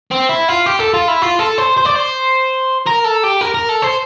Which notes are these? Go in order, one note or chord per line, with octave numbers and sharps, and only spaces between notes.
C4
E4
F4
G4
A4
F4
E4
F4
A4
C5
C5
D5
C5
A#4
A4
G4
A#4
A#4
A4
C5